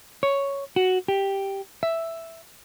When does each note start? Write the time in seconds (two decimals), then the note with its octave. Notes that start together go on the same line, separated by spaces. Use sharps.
0.23 C#5
0.76 F#4
1.08 G4
1.83 E5